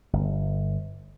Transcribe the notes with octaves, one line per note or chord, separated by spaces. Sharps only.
G1